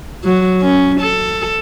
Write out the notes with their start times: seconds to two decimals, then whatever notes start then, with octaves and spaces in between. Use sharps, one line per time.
0.25 F#3
0.61 C#4
1.01 A4